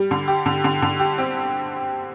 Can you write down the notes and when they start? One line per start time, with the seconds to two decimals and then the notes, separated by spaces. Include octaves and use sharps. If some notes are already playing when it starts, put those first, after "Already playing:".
Already playing: G3
0.11 D3
0.28 G4
0.46 D3
0.64 D3
0.82 D3
0.99 G4
1.18 C4